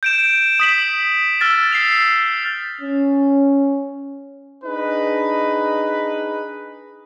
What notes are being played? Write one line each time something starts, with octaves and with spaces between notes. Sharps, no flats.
G6 D7 E7
D#6 B6 F#7
E6 F6 A6
C7 F7
C#4
D4 D#4 G#4 B4